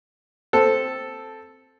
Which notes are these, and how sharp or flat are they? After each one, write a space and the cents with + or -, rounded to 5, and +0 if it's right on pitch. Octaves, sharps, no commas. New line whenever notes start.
C4 +0 A4 +0